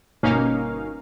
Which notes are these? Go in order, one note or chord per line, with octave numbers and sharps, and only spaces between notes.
G1 B2 A#3 C#4 D#4 F5